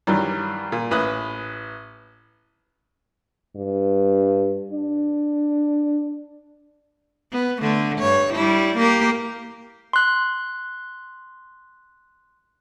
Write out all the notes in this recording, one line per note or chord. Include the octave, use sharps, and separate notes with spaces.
G2 D#3 E3 F#3 G3
A#2
A1 B4 B5 D#6 F#6
G2
D4
B3
D3 A3
G2 C#5
G3 E4
A#3 G4 A#4
C6 F#6